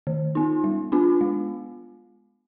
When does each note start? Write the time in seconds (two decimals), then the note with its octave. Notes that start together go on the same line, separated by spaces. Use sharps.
0.07 D#3
0.35 B3 D#4
0.64 G3
0.92 B3 D4 F4
1.21 G#3